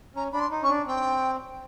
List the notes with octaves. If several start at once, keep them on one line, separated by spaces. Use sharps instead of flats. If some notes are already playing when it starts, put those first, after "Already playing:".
C#4 A#5
D4 B5
C6
D#4
C#4 C#6
D4
C4 G5